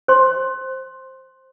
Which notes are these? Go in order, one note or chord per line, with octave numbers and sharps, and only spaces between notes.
C5 C6